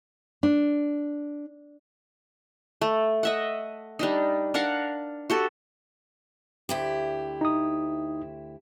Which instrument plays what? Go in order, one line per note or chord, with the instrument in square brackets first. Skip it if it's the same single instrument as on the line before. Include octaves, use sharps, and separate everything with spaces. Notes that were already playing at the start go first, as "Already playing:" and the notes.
[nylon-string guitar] D4
[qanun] A3
D#5 E5 F#5
G3 D4 D#4
D4 A#4 F5 F#5
F#4 G4 A4
[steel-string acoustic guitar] D2 E4 G4
[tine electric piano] D#4 D#6